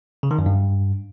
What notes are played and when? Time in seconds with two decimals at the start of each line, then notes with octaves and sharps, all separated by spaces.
0.23 C#3
0.31 D#3
0.39 F#2
0.46 G2